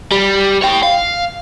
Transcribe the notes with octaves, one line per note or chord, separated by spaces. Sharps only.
G3
C#5 G5
F5